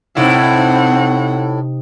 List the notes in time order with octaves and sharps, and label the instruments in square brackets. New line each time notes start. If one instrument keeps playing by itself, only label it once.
[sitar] A2 E4 [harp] C3 D#4 [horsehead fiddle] C4 F#5